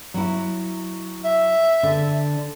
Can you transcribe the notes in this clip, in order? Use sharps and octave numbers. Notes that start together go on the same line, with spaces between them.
F#3 E4
E5
D3